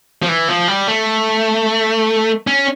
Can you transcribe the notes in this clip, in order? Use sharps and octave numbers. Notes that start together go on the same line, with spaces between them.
F3
E3
F3
G3
A3
C#4